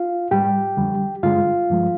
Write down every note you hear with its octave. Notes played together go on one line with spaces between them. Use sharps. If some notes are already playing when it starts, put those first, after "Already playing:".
Already playing: F4 F5
G#2 G3 G4 G5
F2 D3 G3
G2 D3 G#3 F4 F5
G2 F3 G#3